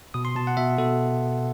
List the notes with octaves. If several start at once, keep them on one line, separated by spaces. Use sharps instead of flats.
B2 D#6
C6
B2 A5
F#5
B2 E5
B2 A4